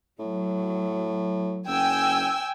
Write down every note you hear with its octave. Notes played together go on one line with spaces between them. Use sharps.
A2 F#3
F#1 G5 G#5 E6